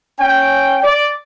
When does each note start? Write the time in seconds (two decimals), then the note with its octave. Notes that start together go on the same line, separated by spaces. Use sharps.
0.20 C#4 G5
0.83 D5